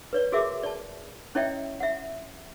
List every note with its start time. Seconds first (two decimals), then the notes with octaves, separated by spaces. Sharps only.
0.13 B4 C#5 D5
0.32 F#4 G#4 A#4 E5 D6
0.63 D5 A5
1.35 C#4 E4 C#5 D#5 E5 G5
1.80 E5 F#5